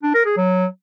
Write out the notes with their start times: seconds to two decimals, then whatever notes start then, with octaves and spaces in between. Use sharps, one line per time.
0.03 D4
0.14 A#4
0.25 G#4
0.37 F#3